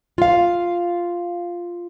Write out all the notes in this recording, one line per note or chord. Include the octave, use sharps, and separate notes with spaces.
F4 F5